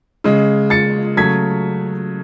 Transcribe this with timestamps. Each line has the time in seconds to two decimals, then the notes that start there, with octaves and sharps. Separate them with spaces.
0.24 C#3 G#3
0.70 A6 C#7
1.17 C#3 F#3 A3 G#6 B6